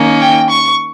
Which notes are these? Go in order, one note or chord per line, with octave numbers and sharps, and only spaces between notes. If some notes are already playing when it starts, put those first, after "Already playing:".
Already playing: D#3 A#3 C#4
G5
C#6